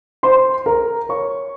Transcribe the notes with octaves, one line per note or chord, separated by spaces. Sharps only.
C5 C6
A#4 A#5
C#5 C#6